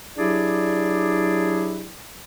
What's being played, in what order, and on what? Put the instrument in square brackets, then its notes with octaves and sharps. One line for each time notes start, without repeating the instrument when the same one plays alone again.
[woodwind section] F#3 D4 E4 G4 G#4 D5